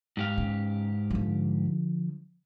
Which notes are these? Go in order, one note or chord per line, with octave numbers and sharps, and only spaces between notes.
G#2 G4 F5
C#3
D3 F3